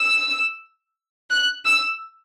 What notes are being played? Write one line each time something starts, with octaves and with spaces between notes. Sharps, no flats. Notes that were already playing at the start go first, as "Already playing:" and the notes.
Already playing: E6
F#6
E6